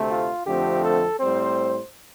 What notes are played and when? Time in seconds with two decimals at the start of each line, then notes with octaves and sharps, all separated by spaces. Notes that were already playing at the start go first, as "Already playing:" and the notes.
Already playing: D2 C3 A3 C4
0.09 F4
0.46 F2 D3 F3 A3 C4 G4
0.82 A4
1.19 A2 G3 C4 C5